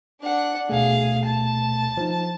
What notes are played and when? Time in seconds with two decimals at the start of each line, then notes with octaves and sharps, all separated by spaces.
0.22 D4 F#5
0.69 D2 B2 A3 G#4 F5
1.25 A5
1.97 F3 D#4